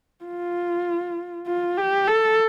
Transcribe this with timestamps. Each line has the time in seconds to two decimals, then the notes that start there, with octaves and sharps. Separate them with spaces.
0.25 F4
1.47 F4
1.77 G4
2.08 A4